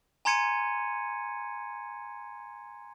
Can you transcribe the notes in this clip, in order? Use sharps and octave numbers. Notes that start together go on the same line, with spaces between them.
G#5 A#5 C6 G#6 C#7 D#7